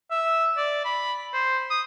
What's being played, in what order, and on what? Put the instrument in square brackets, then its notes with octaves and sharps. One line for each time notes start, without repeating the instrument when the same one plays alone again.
[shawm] E5
D5
B5
C5
D#6